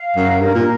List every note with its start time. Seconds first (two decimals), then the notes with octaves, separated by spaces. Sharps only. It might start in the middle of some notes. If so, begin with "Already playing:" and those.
Already playing: F5
0.16 F#2 A#4
0.40 G2 A#4
0.55 A#2